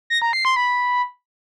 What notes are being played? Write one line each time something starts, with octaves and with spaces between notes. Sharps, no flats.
A#6
A#5
C7
C6
B5